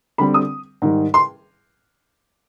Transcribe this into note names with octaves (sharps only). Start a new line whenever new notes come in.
D3 G3 C4 B5
D#6
G#2 D#3 G3
C6